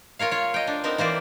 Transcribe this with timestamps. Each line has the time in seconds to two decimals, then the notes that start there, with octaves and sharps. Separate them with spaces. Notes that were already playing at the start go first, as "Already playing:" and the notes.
0.19 F4 A#4 C#5 F5
0.31 F4 C#5
0.54 D#5 G5
0.67 D4
0.84 B3 C4 D#4 A#4
0.98 E3 A#3 C5 D5